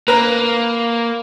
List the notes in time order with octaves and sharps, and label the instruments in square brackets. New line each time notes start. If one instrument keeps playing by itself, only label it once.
[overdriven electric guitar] A#3 [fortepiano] B4 A#5